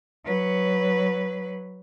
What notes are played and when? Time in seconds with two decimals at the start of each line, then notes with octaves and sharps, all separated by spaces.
0.24 F#3 B4